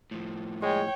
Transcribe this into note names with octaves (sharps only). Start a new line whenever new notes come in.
A2 F3
G#3 C#5 G5